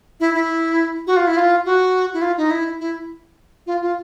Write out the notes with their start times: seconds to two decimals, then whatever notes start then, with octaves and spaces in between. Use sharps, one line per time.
0.20 E4
0.34 E4
1.07 F#4
1.17 F4
1.27 E4
1.37 F4
1.65 F#4
2.14 E4
2.22 F4
2.37 D#4
2.51 E4
2.80 E4
3.67 F4
3.82 F4